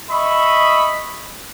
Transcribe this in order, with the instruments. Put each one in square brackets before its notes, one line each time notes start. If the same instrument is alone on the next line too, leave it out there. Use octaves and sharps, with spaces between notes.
[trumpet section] D#5 E5 B5 C#6 D#6